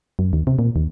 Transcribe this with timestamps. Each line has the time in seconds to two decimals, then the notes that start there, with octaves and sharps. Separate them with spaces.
0.19 F#2
0.33 D#2
0.47 C3
0.59 A#2
0.76 D#2